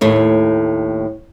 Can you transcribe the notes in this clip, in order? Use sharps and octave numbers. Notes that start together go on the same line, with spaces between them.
D#2 A2 A3